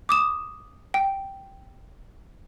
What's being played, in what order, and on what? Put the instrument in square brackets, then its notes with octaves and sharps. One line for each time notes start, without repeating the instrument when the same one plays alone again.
[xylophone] D6 D#6 E7
G5